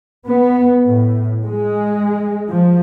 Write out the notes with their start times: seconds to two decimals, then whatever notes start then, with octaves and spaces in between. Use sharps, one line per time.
0.25 B3
0.85 A2
1.46 G#3
2.49 F3